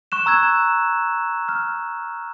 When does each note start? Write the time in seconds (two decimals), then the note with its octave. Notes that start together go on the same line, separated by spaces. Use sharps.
0.12 C#6 F#6 E7
0.26 A#5 E6 F#6 G#6
1.48 F6